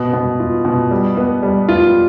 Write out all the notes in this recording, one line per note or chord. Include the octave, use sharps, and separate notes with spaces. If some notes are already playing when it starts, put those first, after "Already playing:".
Already playing: B2
B2
F4
B2
G3
B3
G3
F4